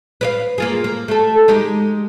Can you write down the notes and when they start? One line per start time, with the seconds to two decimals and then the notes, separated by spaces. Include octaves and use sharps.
0.21 B4 D5 F5
0.58 A#3 F4 G#4
0.84 A#3
1.08 A3 A4
1.48 G#3 D#4 G4